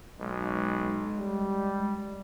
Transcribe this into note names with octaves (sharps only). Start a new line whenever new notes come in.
B1 G#3
G3